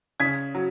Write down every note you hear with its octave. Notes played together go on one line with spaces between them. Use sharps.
C#3 G#6 B6
F#3